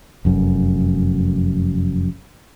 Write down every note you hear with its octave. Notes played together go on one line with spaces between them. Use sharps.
F1 F#2